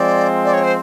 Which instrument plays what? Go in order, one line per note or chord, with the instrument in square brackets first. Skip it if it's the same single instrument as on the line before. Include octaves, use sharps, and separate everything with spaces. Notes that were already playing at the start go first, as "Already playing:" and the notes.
Already playing: [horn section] F3 G#3 C4 [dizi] D5
[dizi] D5
C#5
C5